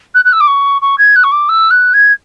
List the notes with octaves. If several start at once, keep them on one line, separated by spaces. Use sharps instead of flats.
F#6
F#6
E6
D6
C#6
C#6
G#6
F#6
C#6
D6
E6
F#6
G#6